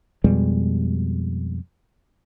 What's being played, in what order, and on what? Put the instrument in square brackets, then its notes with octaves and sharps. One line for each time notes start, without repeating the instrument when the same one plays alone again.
[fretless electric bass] F2 B2 G3 G#3